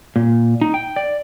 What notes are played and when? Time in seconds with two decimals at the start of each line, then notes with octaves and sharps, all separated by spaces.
0.16 A#2
0.61 D#4
0.74 G5
0.96 D5